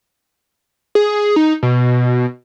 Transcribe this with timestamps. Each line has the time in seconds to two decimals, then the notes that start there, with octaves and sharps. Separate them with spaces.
0.95 G#4
1.36 D#4
1.63 B2